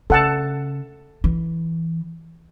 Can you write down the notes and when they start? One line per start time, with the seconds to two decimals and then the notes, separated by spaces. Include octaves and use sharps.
0.10 C#3 A4 F#5 A5
1.24 E3